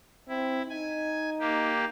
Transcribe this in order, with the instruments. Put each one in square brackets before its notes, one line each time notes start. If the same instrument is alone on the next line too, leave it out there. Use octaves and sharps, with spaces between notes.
[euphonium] C4 [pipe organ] E4
[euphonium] D#4 [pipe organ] G#5
[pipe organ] A#3 G4